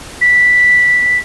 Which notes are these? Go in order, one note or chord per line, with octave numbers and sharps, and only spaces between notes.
B6